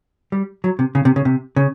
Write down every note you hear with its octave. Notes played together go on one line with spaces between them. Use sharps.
G3
F#3
C3
C#3
C3
C#3
C3
C#3